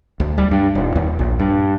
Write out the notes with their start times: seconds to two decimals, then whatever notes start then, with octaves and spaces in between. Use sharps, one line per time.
0.20 D2
0.38 G3
0.51 G2
0.75 D#1
0.95 D#2
1.19 A#1
1.39 G2